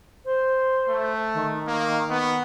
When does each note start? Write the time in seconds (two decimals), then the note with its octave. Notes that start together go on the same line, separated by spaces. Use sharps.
0.25 C5
0.89 A3
1.33 D#3
1.68 A#3
2.10 B3